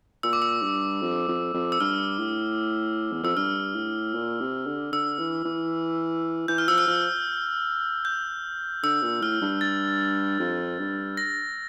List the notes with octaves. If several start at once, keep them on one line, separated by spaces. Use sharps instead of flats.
A#2 E6
D6
E6
G2
F2
F2
F2
E6
G2 F6
A2
E2
F2 E6
G2 F6
A2
A#2
C3
D3
D3 E6
E3
E3
E3 G6
F6
F3 E6
F6
F3
G6
D3 E6
A#2
A2 F6
G2
A6
F2
G2
A#6